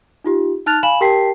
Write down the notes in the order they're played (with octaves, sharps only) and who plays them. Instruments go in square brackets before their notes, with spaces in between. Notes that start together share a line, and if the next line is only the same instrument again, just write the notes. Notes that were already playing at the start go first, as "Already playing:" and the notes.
[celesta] D#4 F4 G4
D#4 A5 F6 F#6 A6 F7
F5 G#5 B5 E7 F#7
G4 A#4 G5 A5 B6 C7